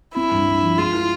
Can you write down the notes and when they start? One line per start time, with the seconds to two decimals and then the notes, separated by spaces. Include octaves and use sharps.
0.15 C4 E4
0.31 G2
0.47 G2
0.63 F3
0.78 G#3 F4
0.94 E4